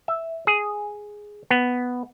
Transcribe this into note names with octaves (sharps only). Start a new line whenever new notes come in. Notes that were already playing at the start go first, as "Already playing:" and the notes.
E5
G#4
B3